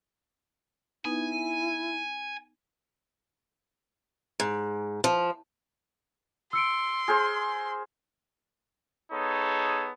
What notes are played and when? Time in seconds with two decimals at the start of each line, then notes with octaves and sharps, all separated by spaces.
1.05 B3 D#4 E4 B4 G#5
4.40 G#2
5.04 F3
6.53 C6 E6 C#7 D7
7.08 G#4 A#4 C5
9.12 B3 D#4 G#4 A4 C#5